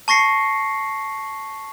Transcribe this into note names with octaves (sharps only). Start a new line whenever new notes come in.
A5 C#6 A#6 C7 C#7